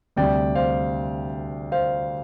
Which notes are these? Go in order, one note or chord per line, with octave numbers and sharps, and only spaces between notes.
D2 C3 G3 D5 G5
C5 F5
C5 F5